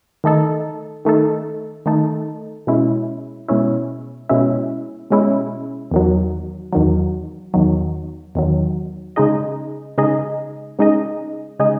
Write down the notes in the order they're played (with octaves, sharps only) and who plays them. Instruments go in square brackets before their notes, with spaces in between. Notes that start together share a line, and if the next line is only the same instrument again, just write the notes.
[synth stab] D#3 A3 D#4 A4
D#3 A3 D#4 A4
D#3 A3 D#4 A4
B2 G#3 C#4 E4
B2 G#3 C#4 E4
B2 G#3 C#4 E4
B2 G#3 C#4 E4
E2 D#3 F#3
E2 D#3 F#3
E2 D#3 F#3
E2 D#3 F#3
C#3 G#3 D#4 G#4 D#5
C#3 G#3 D#4 G#4 D#5
C#3 G#3 D#4 G#4 D#5
C#3 G#3 D#4 G#4 D#5